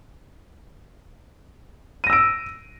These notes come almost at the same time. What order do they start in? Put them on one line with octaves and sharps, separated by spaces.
D#7 A#6 E6 D7